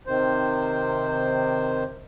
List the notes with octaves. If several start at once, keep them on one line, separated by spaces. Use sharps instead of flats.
C3 D#3 C5